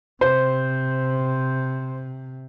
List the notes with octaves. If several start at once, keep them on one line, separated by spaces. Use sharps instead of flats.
C3 C5